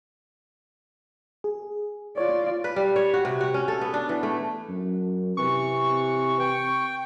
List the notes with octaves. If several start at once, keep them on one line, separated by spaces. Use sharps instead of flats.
G#4
F4 C#5 D5
B4
G3
C#5
F#4
C3
F#4
C#4
A4
B3
D4
E3
A3
F#2
C3 E3 C#6
G5